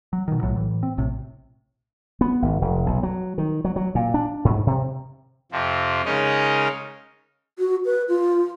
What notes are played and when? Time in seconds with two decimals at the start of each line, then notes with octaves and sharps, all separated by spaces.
0.13 F#3
0.28 B2 D#3
0.41 B1 A2 F#3
0.56 A2 E3
0.83 C4
0.98 A#1 A2 C3
2.21 B3
2.42 G#1
2.62 F1
2.86 B1
3.03 F#3
3.38 D#3
3.65 F#3
3.76 F#3
3.95 A#2
4.14 D4
4.45 G#2
4.67 C3
5.52 F2 C3 F3
6.05 C#3 G#3 C#4 D#4 A#4 D#5
7.59 F#4
7.85 B4
8.09 F4